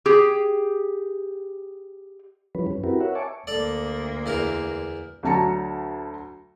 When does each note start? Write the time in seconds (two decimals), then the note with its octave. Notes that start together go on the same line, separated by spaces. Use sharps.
0.06 G4 G#4
2.55 E3 F3 G3 C#4 B4
2.67 F#2 C#4
2.84 C4 E4 F#4 G4 A#4 B4
3.00 A#4 C#5 E5 F#5
3.15 C#5 E5 G#5 A5 C#6 D6
3.47 D2 A#3 A4 D5
4.26 E2 E4 A#4
5.23 D2 D3 F#3 A5 A#5 C#7